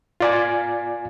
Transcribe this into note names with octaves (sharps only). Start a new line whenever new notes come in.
F4 D5 G#5